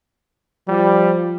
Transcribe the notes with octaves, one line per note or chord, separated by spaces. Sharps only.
F3 G3